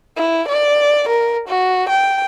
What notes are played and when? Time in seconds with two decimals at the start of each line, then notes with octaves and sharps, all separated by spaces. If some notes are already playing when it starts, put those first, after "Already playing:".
0.17 E4
0.48 D5
1.09 A#4
1.48 F#4
1.89 G5